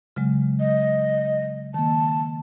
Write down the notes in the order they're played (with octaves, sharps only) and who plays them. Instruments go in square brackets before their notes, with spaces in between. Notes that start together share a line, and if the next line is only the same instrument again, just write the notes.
[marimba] C#3 F#3 G#3
[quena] D#5
[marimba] D#3 A#3 [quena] A5